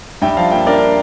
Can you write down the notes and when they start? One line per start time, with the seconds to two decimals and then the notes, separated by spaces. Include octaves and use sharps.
0.22 G2 E5 G5
0.37 F3 F5 A5
0.51 A#3 E5 G5
0.66 D4 A#4 D5